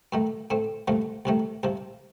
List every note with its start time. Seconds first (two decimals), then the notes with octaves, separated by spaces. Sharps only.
0.13 F#2 D#3 A3
0.50 A2 A3 C4
0.88 C2 A#2 F3 A3
1.25 C2 C3 D#3 A3
1.63 C2 C3 F3